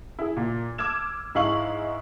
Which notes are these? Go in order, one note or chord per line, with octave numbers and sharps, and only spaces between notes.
E4 G#4
A#2
D6 E6 F6 G#6 E7
G#2 G#3 E4 F5 C#6 F#7